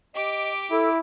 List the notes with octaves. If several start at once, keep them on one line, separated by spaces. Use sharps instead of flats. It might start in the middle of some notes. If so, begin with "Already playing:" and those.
G4 D#5 D6
E4 A4